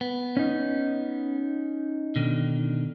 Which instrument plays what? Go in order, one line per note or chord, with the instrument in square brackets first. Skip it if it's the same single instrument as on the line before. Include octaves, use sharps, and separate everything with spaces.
[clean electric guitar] B3
[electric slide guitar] C#4 D#4
[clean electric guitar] B2 D3 D#3